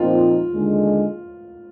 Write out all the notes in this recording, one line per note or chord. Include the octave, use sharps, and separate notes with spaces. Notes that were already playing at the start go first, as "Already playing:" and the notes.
Already playing: A#2 F3 C4 D#4 F4
D#2 D3 G#3